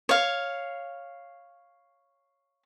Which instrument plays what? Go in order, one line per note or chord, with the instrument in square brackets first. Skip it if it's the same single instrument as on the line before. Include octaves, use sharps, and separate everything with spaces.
[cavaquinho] C#5 F5